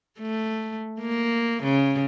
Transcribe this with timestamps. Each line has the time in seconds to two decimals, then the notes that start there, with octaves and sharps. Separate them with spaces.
0.19 A3
1.00 A#3
1.63 C#3